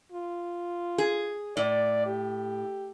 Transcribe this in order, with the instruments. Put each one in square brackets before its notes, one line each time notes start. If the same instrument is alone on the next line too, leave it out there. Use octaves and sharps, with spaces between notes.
[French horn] F4
[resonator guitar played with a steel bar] G#4
[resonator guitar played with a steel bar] A2 [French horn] D5
[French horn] G4